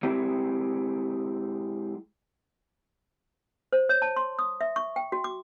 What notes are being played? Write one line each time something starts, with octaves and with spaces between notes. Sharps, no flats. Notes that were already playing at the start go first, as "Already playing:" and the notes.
G#3 C4 E4 G4
C5
C#5
A5
C6
D#6
E5
C#6
G5
F#4
D6